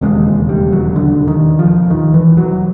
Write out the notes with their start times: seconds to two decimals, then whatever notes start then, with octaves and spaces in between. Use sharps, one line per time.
0.01 E1 D#2 C#3 G#3
0.49 G3
0.72 F#3
0.96 D3
1.28 D#3
1.59 F3
1.90 D#3
2.14 E3
2.37 F#3